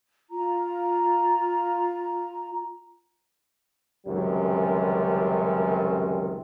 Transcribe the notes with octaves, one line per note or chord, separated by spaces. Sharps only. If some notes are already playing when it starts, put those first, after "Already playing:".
F4 A#5
C#2 F#2 C3 D#3 G3